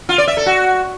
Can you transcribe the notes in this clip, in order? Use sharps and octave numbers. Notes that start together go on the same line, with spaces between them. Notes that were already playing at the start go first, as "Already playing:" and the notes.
F4
D5
E5
A4
F#4